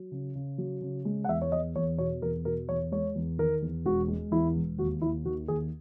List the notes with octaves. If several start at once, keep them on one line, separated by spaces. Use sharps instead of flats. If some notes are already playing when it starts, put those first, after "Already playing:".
Already playing: F#3
C#3
C#3
F#3
C#3
G#3
F#5
E2 E5
C#5
E2 D#5
E2 C#5
B2 C#5
E2 A#4
B2 A#4
E2 C#5
G#3 C#5
E2
D#3 A#4
E2
E1 F#4
G#3
E2 E4
E1
D#2 F#4
D#2 E4
D#3 F#4
D#2 G#4